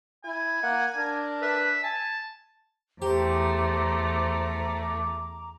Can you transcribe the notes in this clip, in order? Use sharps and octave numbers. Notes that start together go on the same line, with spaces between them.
E4 G#5
A#3 F#5
D4 A#4
B4 E5
G#5 A5
E2 A3 G4 C5 A#5 D6